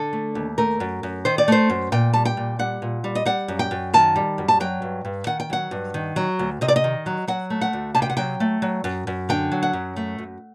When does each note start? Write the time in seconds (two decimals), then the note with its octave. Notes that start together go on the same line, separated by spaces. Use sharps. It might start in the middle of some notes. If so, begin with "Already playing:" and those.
Already playing: D3 A4
0.13 A3
0.35 D#2
0.58 A3 A#4
0.80 F#2
1.03 F#2
1.25 D#3 C5
1.38 D5
1.48 A3 C5
1.70 F#2
1.92 A#2 G5
2.13 G3 A5
2.25 G5
2.37 A#2
2.59 G3 F#5
2.82 A#2
3.04 G3
3.15 D#5
3.25 G3 F#5
3.48 F#2
3.59 G5
3.71 F#2
3.94 D#3 A5
4.16 G3
4.38 F#2
4.48 A5
4.60 F#3 G5
4.82 G2
5.05 G2
5.27 D#3 F#5
5.40 G5
5.50 F#3 F#5
5.71 G2
5.94 D#3
6.16 F#3
6.39 D2
6.61 C3 D#5
6.68 D5
6.76 D#5
6.84 D#3
7.06 F#3
7.28 F#3 F#5
7.50 A3
7.61 F#5
7.73 D2
7.95 C3 A5
8.02 G5
8.10 F#5
8.17 F#3 G5
8.40 A3
8.62 F#3
8.84 F#2
9.07 F#2
9.29 D3 G5
9.52 F#3
9.63 F#5
9.73 F#2
9.96 A3
10.18 F#2